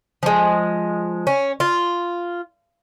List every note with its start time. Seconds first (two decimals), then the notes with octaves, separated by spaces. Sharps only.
0.23 F3 G#3
1.27 C#4
1.60 F4